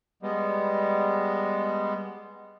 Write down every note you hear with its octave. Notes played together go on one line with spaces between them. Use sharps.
G3 G#3 B3